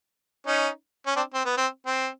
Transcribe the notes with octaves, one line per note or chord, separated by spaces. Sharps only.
C#4 D#4
C#4
C4 D4
C4
B3
C4
C4